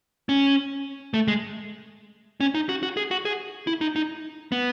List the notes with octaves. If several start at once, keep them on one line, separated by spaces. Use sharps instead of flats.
C#4
A3
G#3
C#4
D#4
F#4
F#4
G#4
F#4
G#4
E4
D#4
D#4
B3